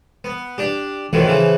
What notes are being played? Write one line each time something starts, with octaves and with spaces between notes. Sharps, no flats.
B3
D4 G4
F2 A2 D#3 E3 F#3
C#3 E3 F3